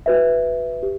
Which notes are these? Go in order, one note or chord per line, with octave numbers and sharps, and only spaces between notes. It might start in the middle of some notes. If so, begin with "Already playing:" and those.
F#4 B4 E5
G4